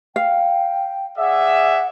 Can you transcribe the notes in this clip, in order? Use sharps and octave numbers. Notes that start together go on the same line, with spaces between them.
F5 G5
G#4 D5 E5 F#5